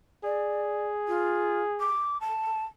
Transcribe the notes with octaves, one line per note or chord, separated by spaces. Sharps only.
G#4 D5
F4
D6
A5